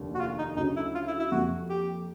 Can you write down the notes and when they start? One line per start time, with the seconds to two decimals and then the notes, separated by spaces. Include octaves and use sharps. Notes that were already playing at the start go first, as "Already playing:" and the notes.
Already playing: F1 D#2 D3
0.15 F#4
0.20 F4
0.39 D#4
0.57 D2 C#3 F#3 D#4
0.76 E4
0.95 F4
1.08 E4
1.20 E4
1.32 F2 C3 F3 A#3 F#4
1.69 G4